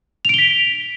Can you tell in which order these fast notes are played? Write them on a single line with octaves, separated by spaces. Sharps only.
F7 D7 G7 B6